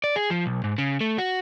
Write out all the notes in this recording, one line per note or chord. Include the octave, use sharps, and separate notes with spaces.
D5
G#4
F3
B1
G#2
C#3
A3
F#4